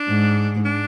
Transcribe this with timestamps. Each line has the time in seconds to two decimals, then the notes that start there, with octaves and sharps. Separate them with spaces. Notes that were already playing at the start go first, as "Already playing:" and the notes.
Already playing: D4
0.09 G#2
0.65 D4